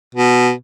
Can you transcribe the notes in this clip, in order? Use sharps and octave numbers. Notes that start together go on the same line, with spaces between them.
B2